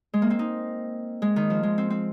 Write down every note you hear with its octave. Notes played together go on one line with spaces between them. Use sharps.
G#3
A#3
C4
D#4
G#3
D#3
F3
G#3
C4
C4